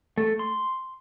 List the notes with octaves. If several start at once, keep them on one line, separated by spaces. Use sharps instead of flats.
A3
C6